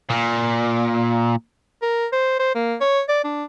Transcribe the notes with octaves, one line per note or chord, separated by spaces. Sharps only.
A#2
A#4
C5
C5
A#3
C#5
D5
D4